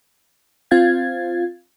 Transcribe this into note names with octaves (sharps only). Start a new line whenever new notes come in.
C4 F4 F5 G#6 A6